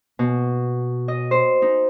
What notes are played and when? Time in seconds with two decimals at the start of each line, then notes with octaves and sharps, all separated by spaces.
0.19 B2
1.08 D#5
1.31 C5
1.62 D#4